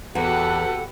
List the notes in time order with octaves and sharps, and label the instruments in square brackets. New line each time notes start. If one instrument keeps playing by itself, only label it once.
[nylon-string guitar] E2 [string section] F#4 G4 B4 [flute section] A4 [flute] F#5